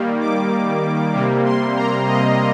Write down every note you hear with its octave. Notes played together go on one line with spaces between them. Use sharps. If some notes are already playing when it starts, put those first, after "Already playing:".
Already playing: D#3 G3 A#3
D6
C3 G3 A#3
C6
A#5
D#5